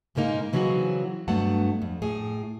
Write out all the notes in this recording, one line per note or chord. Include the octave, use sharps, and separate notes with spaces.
G#2 C#3 G#3 A#3 D#4 A#4
C#3 E3 F#3 C4 F#4 G#4
G2 F#3 A3 B3 F#5 A5
F2
A2 G#4